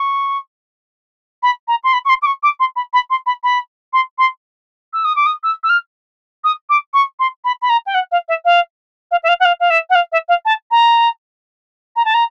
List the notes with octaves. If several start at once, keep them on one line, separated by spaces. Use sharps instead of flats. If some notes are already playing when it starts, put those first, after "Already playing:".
Already playing: C#6
B5
A#5
C6
B5
C#6
C6
D6
C#6
D6
C6
B5
B5
C6
B5
B5
C6
C6
E6
D#6
D6
D#6
E6
E6
F6
D#6
D6
C#6
C6
B5
B5
A#5
G5
F#5
F5
E5
F5
F5
E5
F5
F#5
F5
F5
E5
F#5
F5
E5
F5
A5
A#5
A#5
A5
A#5